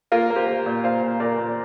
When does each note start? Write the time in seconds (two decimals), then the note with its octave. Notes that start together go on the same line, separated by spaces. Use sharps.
0.12 A#3 F4 A#4
0.30 A#3
0.36 G4 C5
0.48 A#3
0.66 A#2
0.84 A#2 C5 F5
1.03 A#2
1.20 A#2 A#4 D5
1.38 A#2